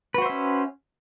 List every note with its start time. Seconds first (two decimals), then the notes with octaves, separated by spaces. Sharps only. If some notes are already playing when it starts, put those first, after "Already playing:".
0.14 B4
0.18 F#4
0.22 C5
0.26 E5
0.29 C#4